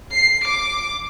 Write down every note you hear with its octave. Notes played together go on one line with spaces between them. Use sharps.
C7
D6